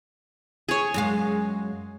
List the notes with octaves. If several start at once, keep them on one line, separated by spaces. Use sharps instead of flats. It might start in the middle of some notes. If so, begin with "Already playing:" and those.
G#4 C#5
F#2 G#3 F5